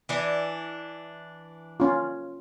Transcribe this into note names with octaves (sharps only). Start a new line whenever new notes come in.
E3 D4
C#4 F4